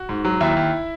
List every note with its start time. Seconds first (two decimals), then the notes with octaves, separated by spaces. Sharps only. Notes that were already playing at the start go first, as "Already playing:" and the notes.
Already playing: F#4
0.09 G#2
0.25 F#3
0.40 D#2 E4 E5
0.56 D#2